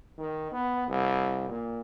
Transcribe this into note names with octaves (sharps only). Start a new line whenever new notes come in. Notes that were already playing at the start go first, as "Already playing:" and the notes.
D#3
B3
C2
A#2